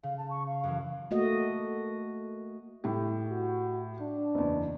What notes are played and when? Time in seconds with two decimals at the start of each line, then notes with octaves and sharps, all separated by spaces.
0.03 C#3 F5
0.17 A5
0.30 C#6
0.46 F5
0.64 F#2 E3
1.11 A3 A#3 F#4 D#5
2.84 A2 G4
3.29 F#4
4.01 D4
4.35 F#1 E2